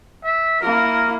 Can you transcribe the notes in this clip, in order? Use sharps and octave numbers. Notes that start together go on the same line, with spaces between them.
E5
A#3 E4 A#4